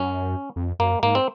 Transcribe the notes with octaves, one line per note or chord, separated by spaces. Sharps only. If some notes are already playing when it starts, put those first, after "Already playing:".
Already playing: F#2 C#4
F2
F#2 A#3
G#2 A#3
C4